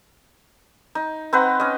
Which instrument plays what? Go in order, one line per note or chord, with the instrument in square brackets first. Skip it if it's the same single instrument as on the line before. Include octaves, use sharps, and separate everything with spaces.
[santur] D#4
C4 D#4 B4 F#5
C#4 D#5